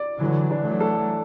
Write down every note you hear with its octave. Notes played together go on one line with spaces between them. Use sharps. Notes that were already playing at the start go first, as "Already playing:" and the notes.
Already playing: D5
D3 E3 F#3
D4
F#3 A3
A4